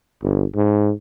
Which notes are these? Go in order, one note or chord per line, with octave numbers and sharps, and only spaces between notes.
G1
G#2